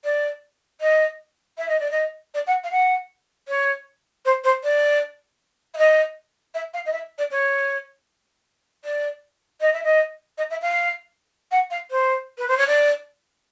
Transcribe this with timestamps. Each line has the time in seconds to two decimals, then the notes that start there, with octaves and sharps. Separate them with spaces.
0.04 D5
0.81 D#5
1.58 E5
1.69 D#5
1.80 D5
1.91 D#5
2.34 D5
2.47 F#5
2.64 F5
2.71 F#5
3.48 C#5
4.25 C5
4.44 C5
4.64 D5
5.74 E5
5.77 D#5
6.54 E5
6.74 F5
6.86 D#5
6.92 E5
7.18 D5
7.31 C#5
8.85 D5
9.61 D#5
9.73 E5
9.84 D#5
10.38 D#5
10.50 E5
10.62 F5
11.51 F#5
11.71 F5
11.91 C5
12.38 B4
12.48 C5
12.57 C#5
12.67 D5